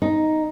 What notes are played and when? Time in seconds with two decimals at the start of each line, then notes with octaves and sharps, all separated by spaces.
0.02 D#4